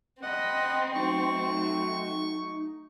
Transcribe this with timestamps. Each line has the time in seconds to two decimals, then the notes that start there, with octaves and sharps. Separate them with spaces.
0.23 C4 D#5 F#5 B5
0.95 F#3 A3 D#4 C#6